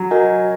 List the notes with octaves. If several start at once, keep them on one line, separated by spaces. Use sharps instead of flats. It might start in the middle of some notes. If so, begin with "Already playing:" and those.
Already playing: F#3
F#4 A#4 D#5 G#5